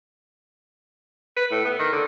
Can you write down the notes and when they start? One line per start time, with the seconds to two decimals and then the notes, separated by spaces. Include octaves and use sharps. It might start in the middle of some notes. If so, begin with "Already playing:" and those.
1.36 B4
1.51 A2
1.65 B3
1.79 D#3
1.92 D3